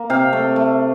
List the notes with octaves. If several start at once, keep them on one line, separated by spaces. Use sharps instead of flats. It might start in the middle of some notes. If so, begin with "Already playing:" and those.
Already playing: A#3
C3 F5 G5
A3
A3